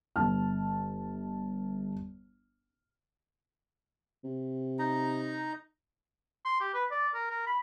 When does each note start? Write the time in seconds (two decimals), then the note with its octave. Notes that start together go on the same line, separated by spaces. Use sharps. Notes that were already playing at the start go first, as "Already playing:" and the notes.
0.16 G1 A5 F6
4.24 C3
4.79 D#4 A#5
6.45 C6
6.60 G4
6.74 B4
6.91 D5
7.14 A#4
7.30 A#4
7.47 B5